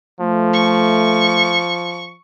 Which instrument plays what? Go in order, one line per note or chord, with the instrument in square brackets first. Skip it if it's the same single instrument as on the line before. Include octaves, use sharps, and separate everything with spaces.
[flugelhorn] F3 [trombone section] A3
[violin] C#6